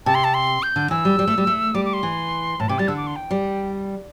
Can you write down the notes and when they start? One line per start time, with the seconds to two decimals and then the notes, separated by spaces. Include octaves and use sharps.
0.06 C3 A5
0.15 C6
0.24 A5
0.34 C6
0.63 G6
0.76 D3
0.90 E3 E6
1.05 G3
1.19 G3
1.27 A3
1.38 G3
1.47 A3
1.75 G3 D6
1.85 D6
1.93 C6
2.03 E3
2.60 A2 A5
2.69 C3 D6
2.79 G3 A6
2.88 D3 E6
2.97 D6
3.07 C6
3.16 G5
3.31 G3